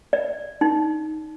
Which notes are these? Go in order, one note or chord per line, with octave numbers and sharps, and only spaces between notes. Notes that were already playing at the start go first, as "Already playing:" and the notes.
D5
D#4